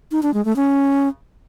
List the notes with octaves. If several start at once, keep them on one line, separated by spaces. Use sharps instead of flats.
D#4
D4
G#3
A3
C#4